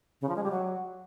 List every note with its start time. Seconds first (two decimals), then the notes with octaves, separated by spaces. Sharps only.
0.21 C#3
0.29 F3
0.36 G#3
0.44 G3
0.51 F#3